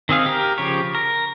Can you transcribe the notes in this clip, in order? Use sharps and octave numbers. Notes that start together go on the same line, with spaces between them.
D#3 C4 G#4 F5
G4 A#4
C#3 F3 G4 C#5
A#4